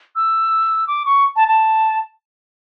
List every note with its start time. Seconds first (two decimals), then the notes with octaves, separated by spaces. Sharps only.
0.16 E6
0.87 D6
1.06 C#6
1.36 A5
1.48 A5